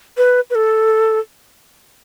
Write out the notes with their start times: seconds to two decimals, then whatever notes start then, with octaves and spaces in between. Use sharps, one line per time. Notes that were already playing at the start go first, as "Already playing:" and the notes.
0.17 B4
0.50 B4
0.55 A4